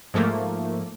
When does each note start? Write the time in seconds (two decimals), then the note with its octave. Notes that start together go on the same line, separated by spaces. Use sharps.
0.14 G#2 F3 A3 A#3